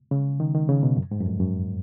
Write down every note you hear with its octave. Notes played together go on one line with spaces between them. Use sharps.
C#3
D#3
D#3
C#3
B2
F#2
G#2
F#2
F2
F#2